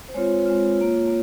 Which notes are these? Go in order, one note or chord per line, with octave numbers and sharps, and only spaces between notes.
C5
G#3 C4 F4 C#5
G#3 C4 F4
A#3 F4
A#3